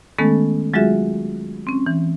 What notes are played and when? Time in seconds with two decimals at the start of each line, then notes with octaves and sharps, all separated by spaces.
0.18 D#3 G#3 A3 B3 C#4 A4
0.74 F#3 G#3 F4 F#4 G#4 E5
1.67 C4 C#4
1.86 E3